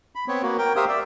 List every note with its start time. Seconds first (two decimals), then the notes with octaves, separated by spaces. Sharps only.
0.15 B5
0.28 B3 C4 C#5
0.43 A#3 F#4
0.58 A#4 G5
0.76 G4 A#4 C5 E5 F5 D#6
0.88 D5 E5